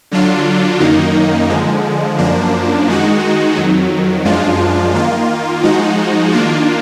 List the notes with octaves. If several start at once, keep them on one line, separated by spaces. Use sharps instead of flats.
D3 F#3 D4 F4
F#2 D#3 A#3 D#4
D3 F3 G#3
F#2 F3 A#3 D4
D#3 G#3 D#4 F#4
F2 D#3 F#3
F#2 F3 G#3 D4 F4
D#3 A#3 F4
F3 G#3 D#4 F#4
D#3 A#3 D4 F4